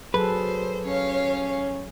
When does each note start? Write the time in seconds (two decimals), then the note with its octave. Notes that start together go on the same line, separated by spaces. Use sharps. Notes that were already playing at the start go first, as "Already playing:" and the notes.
0.14 F#3 G#4 A4 B4 C5
0.85 C#4 C#5 F5